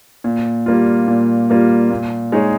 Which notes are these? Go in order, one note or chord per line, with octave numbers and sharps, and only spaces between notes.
A#2
G3 A#3 F4
A#2
G3 A#3 F4
A#2
G#3 D#4 G#4 C#5